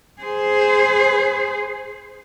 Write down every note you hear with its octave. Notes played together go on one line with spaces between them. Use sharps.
G#4 C5